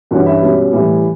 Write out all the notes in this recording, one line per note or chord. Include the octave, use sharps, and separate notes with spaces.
G2 E3 G3 C#4 F#4 F#5
E4 E5
B2 G3 C#4
A2 E3 G3